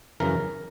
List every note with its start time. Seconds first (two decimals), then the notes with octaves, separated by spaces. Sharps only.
0.20 F#2 C#3 E3 A#4